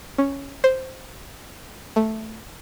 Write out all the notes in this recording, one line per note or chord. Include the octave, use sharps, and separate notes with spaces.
C#4
C5
A3